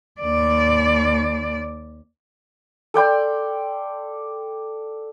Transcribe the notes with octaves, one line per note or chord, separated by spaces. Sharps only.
D#2 D5
A4 D5 G5 C6